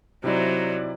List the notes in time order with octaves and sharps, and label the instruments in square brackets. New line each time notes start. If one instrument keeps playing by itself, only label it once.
[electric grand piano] C3 E4 D5 [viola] F#3 [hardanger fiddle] D#4 C5